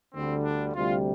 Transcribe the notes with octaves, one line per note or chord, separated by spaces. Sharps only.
D2 D3 G3 C4
D4
D2 C3 G3 F4